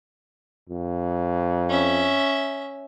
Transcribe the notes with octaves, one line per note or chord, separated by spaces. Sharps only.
F2
C#4 E5